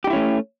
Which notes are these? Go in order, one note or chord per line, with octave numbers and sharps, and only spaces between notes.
A3 C#4 D#4 E4 G4